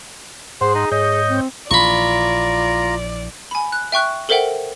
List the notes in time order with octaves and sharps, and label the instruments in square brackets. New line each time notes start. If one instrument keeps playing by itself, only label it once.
[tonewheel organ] G#2 F#5 C6 [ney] G#4 [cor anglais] C5
[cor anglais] D#4
[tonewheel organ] G#2 C#5 G6 [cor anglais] D#5
[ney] C4
[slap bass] A#1 E3 [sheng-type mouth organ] F4 A#5 [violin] D5 [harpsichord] B5 C#6
[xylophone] G#5 B5
F#6
E5 G5 C#6 F#6
A4 A#4 C5 E5 F#5 G5